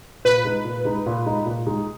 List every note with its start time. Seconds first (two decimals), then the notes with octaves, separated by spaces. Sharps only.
0.25 A#2 B4
0.45 G#3 D#4
0.65 A#2
0.85 G#3 D#4
1.06 A#2
1.26 G#3 D#4
1.46 A#2
1.67 G#3 D#4